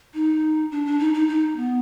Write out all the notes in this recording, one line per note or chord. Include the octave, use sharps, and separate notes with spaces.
D#4
D4
D4
D#4
D#4
D#4
B3